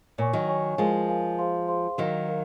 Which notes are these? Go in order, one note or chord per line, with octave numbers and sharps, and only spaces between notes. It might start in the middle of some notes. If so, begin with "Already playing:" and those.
A#2 C#5 G#5 C#6
D#3 F#3
C#5 G#5 C#6
F3 G#3 A#4 F5 G#5
A#4 F5 G#5
G#4 C5 F5 C6
G#4 C5 F5 C6
D#3 F#3 F#4 A#4 F5
F#4 A#4 F5